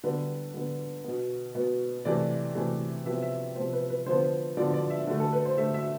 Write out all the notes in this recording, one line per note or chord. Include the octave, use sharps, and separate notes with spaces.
D3 G3 B3 B4
D3 G3 B3
B2 B3
B2 B3
C3 E3 A3 D5
C3 E3 A3
C3 F3 B3 E5
E5
C3 F3 B3 C5
B4
B4
D3 F3 B3 C5
D3 F3 B3 D5
D5
E5
D3 A3
A4
B4
C5
D3 A3 E5
E5